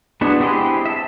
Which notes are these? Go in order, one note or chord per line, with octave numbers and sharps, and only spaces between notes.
G#3 B3 D4 E4 F#4
C4 E4 G4 G#4 C6
E5 A5